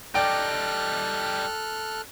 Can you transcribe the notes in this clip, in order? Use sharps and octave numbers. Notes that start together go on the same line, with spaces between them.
G3 D#4 A4 D5 G5 D6 F6 F#6